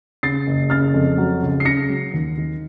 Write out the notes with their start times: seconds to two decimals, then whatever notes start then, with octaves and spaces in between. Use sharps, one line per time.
0.23 C#3 A6 C7
0.47 F#1
0.70 C#3 F6 A6
0.94 F2
1.18 F#3
1.42 C#2
1.60 C7
1.65 C#3 A#6 C#7
1.89 F#3
2.14 D#2
2.37 D#3